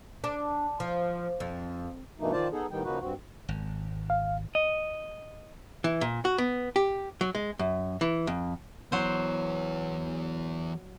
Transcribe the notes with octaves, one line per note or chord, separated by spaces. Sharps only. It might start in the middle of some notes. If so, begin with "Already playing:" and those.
D4
F3
F2
G2 B2 E3 A3 A#3 D#4
D#3 F3 F4 C5 D5 A5
B3 D#4 G#4 A4
A2 D#3 G3 B3 D#4 G5
C#3 F3 A#3 D#4 F#4 B4
G2 C4 F#4
G#1
F5
D#5
E3
A#2
F#4
B3
G4
F#3
G#3
F#2
E3
F2
E3 F#3 B3 C5